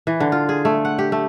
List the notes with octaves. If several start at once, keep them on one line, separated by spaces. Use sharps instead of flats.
E3
D3
F4
G#4
A3
F#5
G4
A3